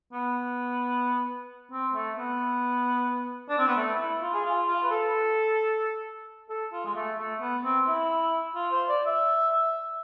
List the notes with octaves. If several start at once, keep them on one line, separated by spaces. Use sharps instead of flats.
B3
C4
A3
B3
D4
C4
B3
A3
E4
F4
G#4
F4
F4
B4
A4
A4
F4
G#3
A3
A3
B3
C4
E4
F4
C5
D5
E5